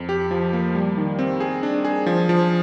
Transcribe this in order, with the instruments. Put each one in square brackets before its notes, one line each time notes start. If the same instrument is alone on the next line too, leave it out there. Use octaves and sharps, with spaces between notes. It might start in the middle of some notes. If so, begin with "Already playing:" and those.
Already playing: [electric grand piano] F2
G4
F3
A#3
G3
D#3
C4
G#4
D4
G#4
F3
F3